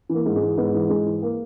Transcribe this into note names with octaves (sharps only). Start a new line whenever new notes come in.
E3 A#3
G#2
G#3
E3
G#2 B3
E3
G#2 G#3
E3
A#3